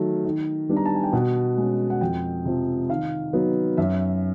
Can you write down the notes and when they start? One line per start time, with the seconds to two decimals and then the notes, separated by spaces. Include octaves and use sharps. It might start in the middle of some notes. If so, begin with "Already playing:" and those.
Already playing: D#3 F#3 A3
0.25 D#3
0.69 G3 B3 D4
0.77 A#5
0.85 A5
0.95 G#5
1.03 G5
1.13 B2 F#5
1.58 G#3 C#4
1.90 F#5
2.01 F2 G5
2.45 C3 F3
2.89 D#3 F5
3.33 F#3 B3 D#4
3.77 F#2 E5